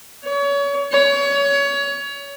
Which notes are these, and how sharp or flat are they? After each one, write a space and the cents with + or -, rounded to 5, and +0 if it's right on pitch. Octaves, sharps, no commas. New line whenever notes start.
C#5 +30
C#5 +25